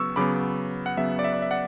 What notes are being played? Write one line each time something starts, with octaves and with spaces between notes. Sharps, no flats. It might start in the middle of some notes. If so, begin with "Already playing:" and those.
Already playing: C#3 F#3 B3 C#6 E6
C#3 F#3 B3 B5 D6
F#5
C#3 F#3 B3 E5
D5
E5
D5
E5
D5 F#5